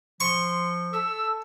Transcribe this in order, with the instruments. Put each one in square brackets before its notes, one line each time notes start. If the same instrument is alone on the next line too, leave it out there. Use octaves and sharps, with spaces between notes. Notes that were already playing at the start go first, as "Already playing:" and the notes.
[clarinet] F3 [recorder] C6 [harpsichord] C#6
[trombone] A4 [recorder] E6